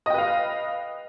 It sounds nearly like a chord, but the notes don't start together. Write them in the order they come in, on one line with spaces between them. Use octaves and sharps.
D#5 G5 B4 F5